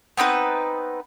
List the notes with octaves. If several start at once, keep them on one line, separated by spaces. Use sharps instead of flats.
B3 C4 D#4 B4